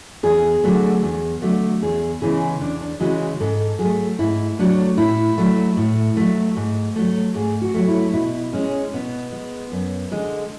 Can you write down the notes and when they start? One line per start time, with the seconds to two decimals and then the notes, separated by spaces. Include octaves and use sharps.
0.23 E2 G#4
0.63 D3 F#3 A3
1.03 E2
1.42 D3 F#3 A3
1.82 E2 G#4
2.22 C#3 E3 G#3 G#4
2.61 E2 D4
2.81 D4
3.00 C#3 E3 G#3 F#4
3.40 G#2 A4
3.79 F#3 G#4
3.84 A3
4.19 G#2 E4
4.59 F#3 A3 D4
4.97 A2 E4
5.38 F#3 A3
5.77 A2
6.17 F#3 A3
6.56 G#2
6.96 F#3 A3
7.35 G#2 G#4
7.62 F#4
7.74 F#3 A3
7.88 E4
8.14 B2 E4
8.53 G#3 C#4
8.94 B2 B3
9.32 G#3
9.72 F#2
10.11 D3 G#3